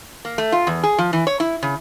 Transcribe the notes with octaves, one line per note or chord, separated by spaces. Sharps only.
A#3
A3
F4
E2
G#4
F3
E3
C#5
E4
C#3